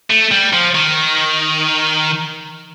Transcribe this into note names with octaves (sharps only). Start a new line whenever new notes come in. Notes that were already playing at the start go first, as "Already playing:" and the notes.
A3
G3
F3
D#3